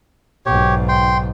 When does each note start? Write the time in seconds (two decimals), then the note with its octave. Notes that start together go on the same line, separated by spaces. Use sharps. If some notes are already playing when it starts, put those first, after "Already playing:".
0.46 B1 G#2 G4 C#5
0.89 G5 C6